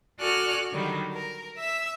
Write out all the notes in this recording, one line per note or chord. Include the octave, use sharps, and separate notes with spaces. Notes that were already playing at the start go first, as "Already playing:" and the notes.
F#4 A4 D5 G#5 F6 F#6
D3 D#3 F#3 G3
A#4
E5 E6